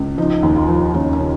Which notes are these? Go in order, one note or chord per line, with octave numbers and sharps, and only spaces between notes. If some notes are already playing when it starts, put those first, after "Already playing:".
Already playing: C#2
F3 D#4
D#2
F4
F3
D#2 C#4
C#4
C#3